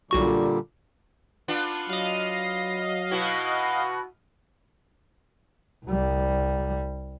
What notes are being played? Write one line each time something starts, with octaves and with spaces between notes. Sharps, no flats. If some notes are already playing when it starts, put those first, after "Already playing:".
B1 A#2 D3 G3 F#4 C#6
B3 D4 F4
F#3 D#5 F5
B2 B3 E4 F#4
C2 G3